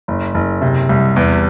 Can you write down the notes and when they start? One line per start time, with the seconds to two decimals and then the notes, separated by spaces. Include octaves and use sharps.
0.08 F#1
0.34 F#1
0.62 C3
0.89 C2
1.16 E2